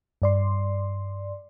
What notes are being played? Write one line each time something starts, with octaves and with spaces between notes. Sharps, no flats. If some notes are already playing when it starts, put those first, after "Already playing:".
G2 D5 C6